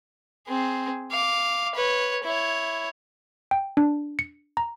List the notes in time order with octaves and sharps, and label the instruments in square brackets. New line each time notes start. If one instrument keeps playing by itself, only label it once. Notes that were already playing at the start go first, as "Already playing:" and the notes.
[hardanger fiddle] C4 G#4
F5 D6
B4 C#5
E4 C#5
[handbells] G5
D4
C#7
A#5